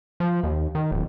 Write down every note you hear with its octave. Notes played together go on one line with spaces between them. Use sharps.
F3
D#2
D#3
D1